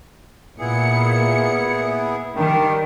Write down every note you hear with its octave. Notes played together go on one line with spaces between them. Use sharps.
A#2 B3 E4 G#4 C#7
D#3 G3 D4 G4